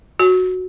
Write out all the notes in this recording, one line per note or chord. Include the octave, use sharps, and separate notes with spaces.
F#4